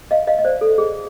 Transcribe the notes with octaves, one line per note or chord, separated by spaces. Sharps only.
D#5 F5
D#5 F5
D#5
C5 D5
A4
G#4